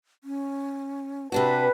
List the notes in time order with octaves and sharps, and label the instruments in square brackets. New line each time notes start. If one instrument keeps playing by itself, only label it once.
[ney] C#4
[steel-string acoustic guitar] C3 D4 F#4 [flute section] B4 [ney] A5